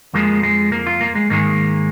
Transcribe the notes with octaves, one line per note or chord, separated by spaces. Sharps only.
F2 F3 G#3 A#3
G#3
A#3
F4
A#3
G#3
G#2 D#3 G#3 A#3